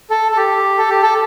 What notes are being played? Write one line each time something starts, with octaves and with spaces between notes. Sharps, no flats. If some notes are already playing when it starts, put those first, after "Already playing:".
A4
A4
G4
A4
G4
A4